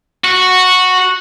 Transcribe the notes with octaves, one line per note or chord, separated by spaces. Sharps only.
F#4